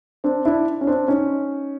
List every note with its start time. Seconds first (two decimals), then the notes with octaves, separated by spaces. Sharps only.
0.24 C4 D4
0.45 D4 E4
0.81 C#4
0.87 C4 D4
1.08 C#4 D#4